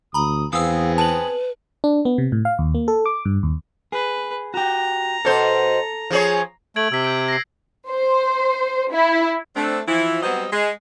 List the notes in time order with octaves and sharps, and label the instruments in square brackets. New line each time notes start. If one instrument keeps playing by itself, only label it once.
[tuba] D2 [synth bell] A#5 B5 [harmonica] D#6
[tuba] E2 [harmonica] B3 C4 G#4 [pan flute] F5 [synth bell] D#6 E6
[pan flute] B4 [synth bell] A5 F#7
[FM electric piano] D4
B3
C3
A2
F5
D#2
A#3
A4
D6
G2
D#2
[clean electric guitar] G#4 [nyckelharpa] B4
[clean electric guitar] F#4 G4 [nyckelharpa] A#5
[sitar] B2 C5 [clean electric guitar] A4
[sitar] F3 G#4 C#5
[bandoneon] A3 [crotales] G#6 D7 F#7
[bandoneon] C3 [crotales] E6 B6
[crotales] G6 D7
A#6 C7
[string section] C5
E4
[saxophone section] A3 C4 D4
E3 F3 E4
F#3 G3 B3 C4 C5 D#5
G#3